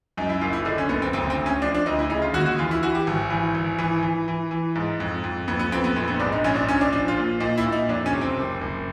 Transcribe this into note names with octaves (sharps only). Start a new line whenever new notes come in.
F#2 D#4
E4
F#1 F4
E4
D3 D#4
C#4
F#1 B3
C4
D2 C4
C4
D2
C#4
F3 D4
D4
D2 D#4
E4
C#3 D#4
F4
D#2 F#4
F#4
E3 F4
E4
E3 F#4
G4
G#1
E3
G#1
E3
E3
E3
E3
G#2
F2
F2
F2 B3
B3
F2 C4
B3
A#1 C4
B3
G#2 D4
D#4
A#1 C#4
D4
A#1 C#4
D4
F3 D4
F4
A#2
A#2 D#4
E4
A#2
D#4
F2 D4
C#4
C3
C4
F#1
F#1